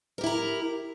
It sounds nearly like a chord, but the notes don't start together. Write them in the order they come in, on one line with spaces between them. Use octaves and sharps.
A#4 G4 E4 A#5